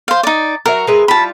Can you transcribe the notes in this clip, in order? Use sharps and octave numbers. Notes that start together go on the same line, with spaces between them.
C5 F5
D#4 D5
F#3 F#4 A#4 E5
G#3 B4 E5
G3 E4 F4 A5 B5